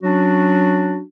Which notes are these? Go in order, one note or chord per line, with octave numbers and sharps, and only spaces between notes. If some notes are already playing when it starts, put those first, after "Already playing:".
F#3 C#4 D4 F#4